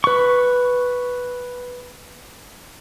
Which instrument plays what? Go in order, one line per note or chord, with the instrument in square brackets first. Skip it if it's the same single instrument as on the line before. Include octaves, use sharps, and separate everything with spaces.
[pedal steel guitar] B4 C#6